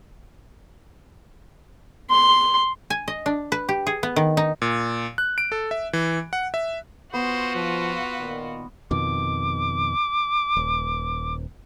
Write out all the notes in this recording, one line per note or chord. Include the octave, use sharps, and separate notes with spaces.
C6
G#5
D#5
D4
B4
G4
G#4
B3
D#3
D#4
A#2
F#6
D7
A4
E5
E3
F#5
E5
B3 F4 F#4 C5
F3 B4
A#2 D#3
F2 B2 D#3 D6
D#1